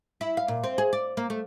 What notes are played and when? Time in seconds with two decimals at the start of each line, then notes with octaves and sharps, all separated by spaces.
0.21 E4
0.37 F5
0.48 A#2
0.64 C4
0.78 G#4
0.93 D5
1.17 A#3
1.30 A3